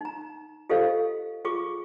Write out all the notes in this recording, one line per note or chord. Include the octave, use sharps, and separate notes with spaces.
D#4 A#5
F4 G4 A4 C5 D#5 F5
F4 G#4 C#6 D6